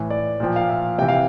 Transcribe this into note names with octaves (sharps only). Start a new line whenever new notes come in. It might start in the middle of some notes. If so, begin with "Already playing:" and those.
Already playing: A2 E3
D5
A#2 F3 G5
F5
E5
C3 E3 G5
F5